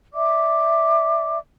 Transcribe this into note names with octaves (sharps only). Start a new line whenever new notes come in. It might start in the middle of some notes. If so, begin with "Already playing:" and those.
D5 E5 D6